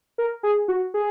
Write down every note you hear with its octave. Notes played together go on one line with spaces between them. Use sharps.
A#4
G#4
F#4
G#4